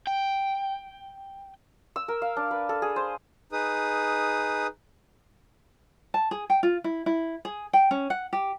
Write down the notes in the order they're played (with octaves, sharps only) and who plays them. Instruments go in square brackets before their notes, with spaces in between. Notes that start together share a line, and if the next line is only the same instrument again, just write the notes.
[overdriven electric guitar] G5
[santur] E6
A#4
F5
D4
B4
A4
G#4
C5
[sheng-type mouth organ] D#4 G#4 B4 D#6
[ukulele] A5
G#4
G5
F4
E4
E4
G#4
G5
C#4
F#5
G4